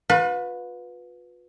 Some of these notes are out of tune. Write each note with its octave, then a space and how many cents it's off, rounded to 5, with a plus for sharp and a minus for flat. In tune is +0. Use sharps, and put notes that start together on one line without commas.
F4 +45 B4 +0